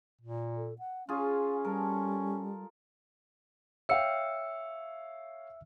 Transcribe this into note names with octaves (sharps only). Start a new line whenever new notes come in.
A#2
A4
F#5
C#4 F4 G#4 F5
G3 A4 A#4
C#5 E5 F5 G5 E6 C#7